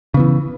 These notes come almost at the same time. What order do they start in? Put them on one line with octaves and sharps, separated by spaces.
C#3 B3 E3